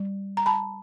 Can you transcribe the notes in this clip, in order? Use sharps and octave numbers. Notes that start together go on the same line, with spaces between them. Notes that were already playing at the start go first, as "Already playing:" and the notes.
Already playing: G3
A#5
A5 B5